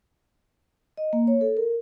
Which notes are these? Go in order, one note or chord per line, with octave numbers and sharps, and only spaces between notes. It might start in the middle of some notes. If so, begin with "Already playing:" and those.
D#5
A#3
C#5
A4
A#4